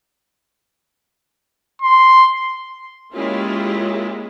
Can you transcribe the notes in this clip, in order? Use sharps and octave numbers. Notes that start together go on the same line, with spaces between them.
C6
G#3 A#3 C#4 E4 F4 G4